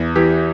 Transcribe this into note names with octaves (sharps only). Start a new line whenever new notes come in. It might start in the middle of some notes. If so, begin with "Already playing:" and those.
Already playing: E2
E3 G4